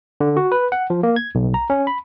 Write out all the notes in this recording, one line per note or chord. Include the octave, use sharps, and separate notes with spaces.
D3
F#4
B4
F#5
F3
A#3
G#6
B1
A#5
C#4
B5